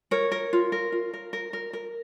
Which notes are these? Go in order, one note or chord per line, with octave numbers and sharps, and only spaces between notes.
A#4 C#5
A#4
F4
A#4
F4
A#4
A#4
A#4
A#4